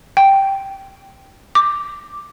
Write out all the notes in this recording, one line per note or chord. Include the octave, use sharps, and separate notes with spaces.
G5
D6